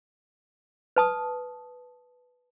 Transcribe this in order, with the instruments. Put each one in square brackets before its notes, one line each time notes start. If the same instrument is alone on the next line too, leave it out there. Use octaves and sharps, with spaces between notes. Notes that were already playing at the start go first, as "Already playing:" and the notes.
[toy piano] B4 A5 D#6